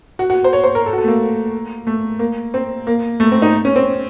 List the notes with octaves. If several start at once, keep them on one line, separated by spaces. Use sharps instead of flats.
F#4
F#4
C5
C#5
C5
A#4
A4
F#4
A4
A3
A#3
A3
A#3
C4
A#3
A3
C4
D#4
C#4
C4